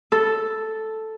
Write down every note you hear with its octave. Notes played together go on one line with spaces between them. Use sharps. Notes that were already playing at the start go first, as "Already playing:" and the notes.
A4